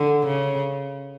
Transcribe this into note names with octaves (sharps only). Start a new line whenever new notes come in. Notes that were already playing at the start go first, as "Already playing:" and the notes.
Already playing: D3
C#3